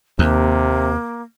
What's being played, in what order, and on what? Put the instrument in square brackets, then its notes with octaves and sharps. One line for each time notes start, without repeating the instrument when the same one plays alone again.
[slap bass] D#2 [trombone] C3 [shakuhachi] A#3